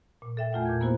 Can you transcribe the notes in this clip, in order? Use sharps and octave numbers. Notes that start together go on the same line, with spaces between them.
A#2
A4 E5 G5
E2 A3 F4 F#5
A#2 G6 G#6
A#3 B3 E4 F#4 C5